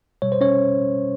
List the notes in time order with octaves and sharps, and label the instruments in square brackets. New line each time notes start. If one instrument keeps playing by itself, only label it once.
[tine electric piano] B2 G3 C#5
C5
C#4 C#5